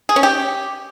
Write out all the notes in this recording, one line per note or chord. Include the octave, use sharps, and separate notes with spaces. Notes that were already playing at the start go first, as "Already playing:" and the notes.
G#4
C#4
G4